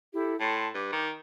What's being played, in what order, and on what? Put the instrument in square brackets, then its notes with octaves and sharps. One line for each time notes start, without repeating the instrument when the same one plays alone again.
[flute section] E4 G4 A4
[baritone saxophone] A2 [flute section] A5 C6
[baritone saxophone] G2 [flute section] D6
[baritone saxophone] D#3